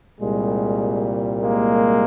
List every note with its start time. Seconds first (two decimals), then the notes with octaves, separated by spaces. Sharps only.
0.18 C2 A#2 G3 G#3
1.41 G#3 A#3